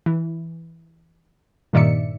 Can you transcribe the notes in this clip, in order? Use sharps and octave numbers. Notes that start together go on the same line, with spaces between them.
E3
G2 A#2 D#3 D5 E5 C#7